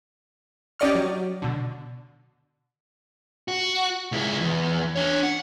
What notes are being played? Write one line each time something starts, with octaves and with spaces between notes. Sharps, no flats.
C#4 G4 D5 D#5 C#6 F6
F#3
B2 D3
F#4
C#2 E4
E2
D4 C#5
F#5